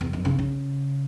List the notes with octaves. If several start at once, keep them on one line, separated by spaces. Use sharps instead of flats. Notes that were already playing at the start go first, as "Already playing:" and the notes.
E2
F#2
C#3
C#3